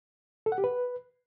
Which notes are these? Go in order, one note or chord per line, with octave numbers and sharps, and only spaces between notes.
A4
F#5
G4
B4